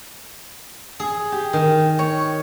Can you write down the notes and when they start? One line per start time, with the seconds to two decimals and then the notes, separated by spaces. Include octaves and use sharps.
1.00 G#4
1.32 G4
1.53 D#3
1.99 C#5